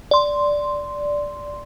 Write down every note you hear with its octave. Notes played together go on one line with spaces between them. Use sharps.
D5 C6